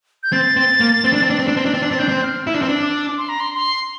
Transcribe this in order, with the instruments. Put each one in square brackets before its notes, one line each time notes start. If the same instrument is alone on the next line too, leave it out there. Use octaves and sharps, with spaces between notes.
[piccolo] G6
[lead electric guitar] C4 [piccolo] A6
[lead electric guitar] C4
A#3
C4
D4
C4
D4
C4
D4
C4
D4
[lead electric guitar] C4 [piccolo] A6
[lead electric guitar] D4
[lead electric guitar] C4 [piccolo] A6
[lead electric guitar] D4 [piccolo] G6
[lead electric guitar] C4
[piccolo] G6
F6
[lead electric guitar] E4 [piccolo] E6
[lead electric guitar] D4
C4
D4
[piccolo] D6
C6
A#5
C6
C6